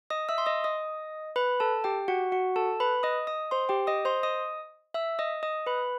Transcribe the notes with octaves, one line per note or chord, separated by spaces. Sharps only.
D#5 D#6
E5 E6
C6
D#5 D#6
D#5 D#6
B4 B5
A4 A5
G4 G5
F#4 F#5
F#4 F#5
A4 A5
B4 B5
D#5 D#6
D#5 D#6
C5 C6
G4 G5
D#5 D#6
C5 C6
D#5 D#6
E5 E6
D#5 D#6
D#5 D#6
B4 B5